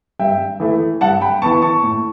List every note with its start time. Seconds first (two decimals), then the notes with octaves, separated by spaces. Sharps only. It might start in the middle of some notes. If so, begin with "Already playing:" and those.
0.19 G2 E5 G5
0.60 E3 A3 E4
1.01 G2 F#5 A5
1.21 G5 B5
1.42 E3 B3 A5 C#6
1.62 A5 C#6
1.83 A2